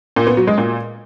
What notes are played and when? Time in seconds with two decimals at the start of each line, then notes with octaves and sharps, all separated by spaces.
0.16 A#2
0.27 B3
0.37 F#3
0.47 G#3
0.58 A#2